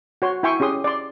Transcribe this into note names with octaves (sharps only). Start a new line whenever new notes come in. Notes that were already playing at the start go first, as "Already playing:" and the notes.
F#4 C#5 C6
E4 E5 G5 G#5 C6 C#6
C#4 G4 G#4 C6 D#6
D5 C6